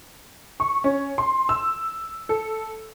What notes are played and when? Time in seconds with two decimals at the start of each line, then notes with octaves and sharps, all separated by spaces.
0.60 C#6
0.84 C#4
1.18 C6
1.49 E6
2.29 A4